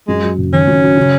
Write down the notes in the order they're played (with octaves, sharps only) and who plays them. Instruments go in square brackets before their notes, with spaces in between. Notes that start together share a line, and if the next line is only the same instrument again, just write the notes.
[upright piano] F#2 [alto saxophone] G#3
[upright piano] F#3
F#1
[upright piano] D#3 [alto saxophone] C#4
[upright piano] F#2
F#3
C#3